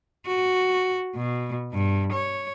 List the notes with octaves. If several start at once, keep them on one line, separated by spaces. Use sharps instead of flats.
F#4
B2
G2
C#5